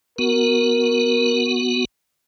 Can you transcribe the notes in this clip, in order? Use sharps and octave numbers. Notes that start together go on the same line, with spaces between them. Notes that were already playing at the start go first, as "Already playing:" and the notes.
B3 F#4 A#4